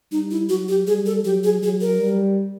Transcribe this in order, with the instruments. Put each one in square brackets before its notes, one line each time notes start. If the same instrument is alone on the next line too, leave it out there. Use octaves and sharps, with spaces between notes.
[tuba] G3 [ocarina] D#4
[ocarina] E4
[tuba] F#3 [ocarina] F#4
[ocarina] G4
[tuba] G3 [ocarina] G#4
[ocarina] A4
[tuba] F#3 [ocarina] G4
[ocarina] G#4
[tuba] F#3 [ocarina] G#4
[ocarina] A#4
[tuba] G3